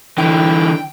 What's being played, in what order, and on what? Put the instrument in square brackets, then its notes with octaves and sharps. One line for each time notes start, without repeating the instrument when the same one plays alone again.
[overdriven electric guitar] D3 E3 [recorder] G5